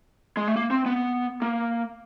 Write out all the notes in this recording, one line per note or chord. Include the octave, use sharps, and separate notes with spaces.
G#3
A3
A#3
C4
B3
A#3